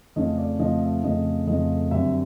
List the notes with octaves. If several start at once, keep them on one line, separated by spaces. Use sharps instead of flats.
F2 C#3 F3 A3 C#4 D#5
D5
F2 C#3 F3 A3 C#4 D#5
E5
F2 C#3 F3 A3 C#4 D#5
F2 C#3 F3 A3 C#4 D#5
F#2 D3 G3 C4 E5